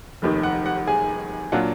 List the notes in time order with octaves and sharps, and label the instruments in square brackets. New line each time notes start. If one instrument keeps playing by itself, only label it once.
[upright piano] F1 D#2 D#3
F#5
F#5
G#4 G#5
A#2 F#3 D4 F4 F#5